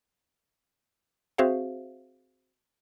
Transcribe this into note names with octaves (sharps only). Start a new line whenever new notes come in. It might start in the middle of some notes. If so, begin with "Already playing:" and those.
C4 F#4 G#4 C5 E5 F5